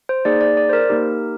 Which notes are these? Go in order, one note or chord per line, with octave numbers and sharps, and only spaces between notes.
C5
A#3 D#4 G#4 D5
D5
D5
C5
A#4
A#3 D#4 G4